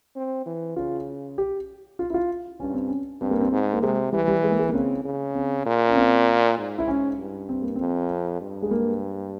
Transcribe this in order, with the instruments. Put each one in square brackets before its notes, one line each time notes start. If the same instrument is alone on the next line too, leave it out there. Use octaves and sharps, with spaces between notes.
[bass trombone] C4
E3
[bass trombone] C#3 [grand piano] F4
[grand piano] G4
F4
E4
F4
[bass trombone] G2 [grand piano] C#4
[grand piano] C4
C#4
[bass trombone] G2 [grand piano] C4
[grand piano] A#3
C4
[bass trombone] G#2
[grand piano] A#3
[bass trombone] C3 [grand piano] G#3
[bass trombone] E3 [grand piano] G3
[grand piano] G3
G#3
A#3
G#3
A#3
[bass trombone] C#3 [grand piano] C4
[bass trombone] C#3
[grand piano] C4
[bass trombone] A#2
[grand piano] C#4
C4
[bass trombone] G#2
[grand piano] E4
C#4
[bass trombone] G2
[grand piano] C4
A#3
[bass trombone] F2 [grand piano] C4
[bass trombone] G2
[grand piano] G#3
A#3